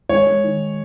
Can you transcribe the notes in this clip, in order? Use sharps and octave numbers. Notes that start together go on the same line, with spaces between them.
G#3 C#5
G#3
D#3